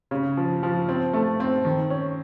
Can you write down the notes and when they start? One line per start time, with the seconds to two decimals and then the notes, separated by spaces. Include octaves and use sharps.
0.11 C#3
0.37 F3
0.63 F3
0.89 C4
1.14 A3
1.40 C4
1.65 D#3
1.90 C#4